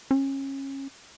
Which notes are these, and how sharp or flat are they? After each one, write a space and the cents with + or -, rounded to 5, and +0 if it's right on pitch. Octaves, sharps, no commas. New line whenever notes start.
C#4 -25